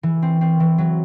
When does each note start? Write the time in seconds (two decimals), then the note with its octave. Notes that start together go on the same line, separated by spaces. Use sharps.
0.03 E3
0.22 C4
0.41 C4
0.60 E3
0.78 F#3